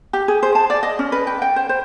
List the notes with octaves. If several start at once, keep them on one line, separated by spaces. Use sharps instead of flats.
G4
G#4
C5
A5
D5
D#5
C#4
B4
G5
G5
C5
C5